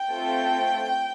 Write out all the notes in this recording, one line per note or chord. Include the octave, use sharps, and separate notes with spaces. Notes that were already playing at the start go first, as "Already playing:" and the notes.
Already playing: G5
A3 C4 F4 A4